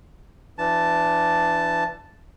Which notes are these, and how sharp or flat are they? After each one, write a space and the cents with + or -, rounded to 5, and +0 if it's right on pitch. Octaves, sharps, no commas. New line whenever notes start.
E3 +30 D4 +0 A5 +0